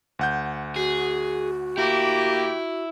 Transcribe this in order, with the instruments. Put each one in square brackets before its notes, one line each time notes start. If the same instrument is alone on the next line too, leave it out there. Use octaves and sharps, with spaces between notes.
[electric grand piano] D2 F#5 G6
[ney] F#4 [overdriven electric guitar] G#4
[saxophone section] A#3 G4 [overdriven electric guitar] E4